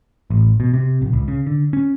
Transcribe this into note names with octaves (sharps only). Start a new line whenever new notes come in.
A1
B2
C3
A#1
C#2
C#3
D3
C#4